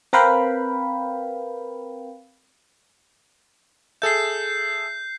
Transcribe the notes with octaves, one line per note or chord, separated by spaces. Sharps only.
C4 A#4 B4 F5 G5 B5
G#4 A4 E5 G6 C7